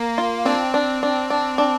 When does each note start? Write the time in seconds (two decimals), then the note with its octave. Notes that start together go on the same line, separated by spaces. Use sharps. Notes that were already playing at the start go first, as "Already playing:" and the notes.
Already playing: A#3 A#4
0.18 F4
0.46 C4 D4
0.74 D4
1.03 D4
1.30 D4
1.58 D4